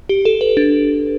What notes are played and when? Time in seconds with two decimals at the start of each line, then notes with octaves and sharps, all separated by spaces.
0.09 G4
0.25 A4
0.41 B4
0.57 D4